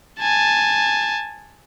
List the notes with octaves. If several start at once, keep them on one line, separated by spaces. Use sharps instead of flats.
G#5 A5